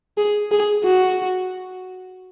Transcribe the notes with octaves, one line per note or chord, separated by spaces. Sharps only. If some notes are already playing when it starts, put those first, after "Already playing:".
G#4
G#4
F#4